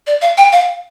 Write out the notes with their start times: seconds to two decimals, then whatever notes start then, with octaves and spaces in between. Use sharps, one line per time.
0.07 D5
0.22 F5
0.38 G5
0.52 F5